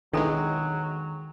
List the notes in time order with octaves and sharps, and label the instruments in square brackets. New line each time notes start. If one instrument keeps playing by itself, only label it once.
[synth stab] B1 E2 G#3 [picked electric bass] D#3 [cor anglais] F#3 [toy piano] D4 A4 B5